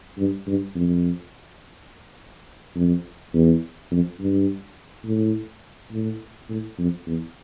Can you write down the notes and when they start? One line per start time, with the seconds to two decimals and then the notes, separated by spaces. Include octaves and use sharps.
0.18 G2
0.47 G2
0.75 F2
2.76 F2
3.34 E2
3.91 F2
4.20 G2
5.06 A2
5.92 A2
6.49 A2
6.78 F2
7.07 E2